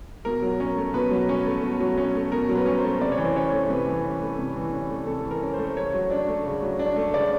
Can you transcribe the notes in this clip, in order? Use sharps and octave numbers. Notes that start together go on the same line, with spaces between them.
B2 A#4
F#3
C#4
A3
B2 B4
F#3
C#4
A3
B2
F#3
C#4
A3
B2 A#4
F#3
B4
C#4
C5
A3
C3 D5
C#5
E3
C5
C#4 C#5
A3
C3 B4
E3
C#4
A3
C3
E3
C#4
A3
C3 A4
E3
A#4
C#4
A3 C5
C#3 C#5
F#3
D4
A3
C#3
F#3
D4
A3
C#3 D5